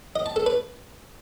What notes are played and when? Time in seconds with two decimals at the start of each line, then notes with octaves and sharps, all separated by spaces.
0.16 D#5
0.26 A5
0.36 A4
0.46 B4